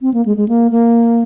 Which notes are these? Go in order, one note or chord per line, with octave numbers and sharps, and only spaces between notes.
C4
A#3
G#3
G#3
A#3
A#3